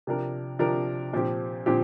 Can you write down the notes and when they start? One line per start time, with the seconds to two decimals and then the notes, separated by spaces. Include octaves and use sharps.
0.07 C3 F3 D4 A#4
0.59 C3 F3 D4 A#4
1.13 A#2 F3 C4 G4
1.66 A#2 F3 C4 G4